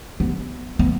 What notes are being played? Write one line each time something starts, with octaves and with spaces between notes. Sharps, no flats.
B3
B3